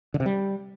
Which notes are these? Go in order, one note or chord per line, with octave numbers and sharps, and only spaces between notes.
D3
C3
G3